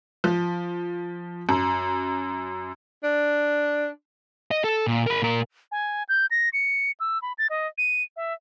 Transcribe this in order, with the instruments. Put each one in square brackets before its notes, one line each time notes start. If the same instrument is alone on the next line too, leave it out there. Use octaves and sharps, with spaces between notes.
[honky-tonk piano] F3
F#2
[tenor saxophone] D4
[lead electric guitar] D#5
A4
A#2
A#4 B5
A#2 A#4
[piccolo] G#5
G6
A#6
C#7
E6
B5
A6
D#5
D#7
E5